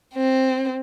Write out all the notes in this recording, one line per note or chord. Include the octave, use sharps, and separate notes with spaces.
C4